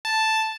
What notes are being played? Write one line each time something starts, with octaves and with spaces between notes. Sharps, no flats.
A5